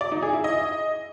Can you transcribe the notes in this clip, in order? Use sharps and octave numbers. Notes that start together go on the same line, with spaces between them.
D5
D#4
G#4
E4
D#5